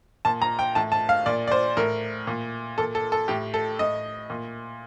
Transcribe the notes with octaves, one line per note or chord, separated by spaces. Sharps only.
A#2 A5
A#5
G5
A2 A5
A5
F5
A#2 D5
D5
C5
A2 A#4
A#2
A#2 A4
A4
A4
A2 G4
A4
A2 D#5
A#2